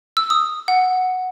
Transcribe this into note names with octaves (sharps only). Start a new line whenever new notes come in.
E6
D#6
F#5